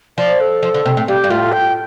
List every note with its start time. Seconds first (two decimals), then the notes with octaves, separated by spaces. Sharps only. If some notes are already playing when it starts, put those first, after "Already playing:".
0.18 F3 D5
0.40 A4
0.63 F3
0.74 D3
0.86 C3
0.97 A2
1.08 G2 G4
1.24 G2
1.30 A2 F4
1.52 G5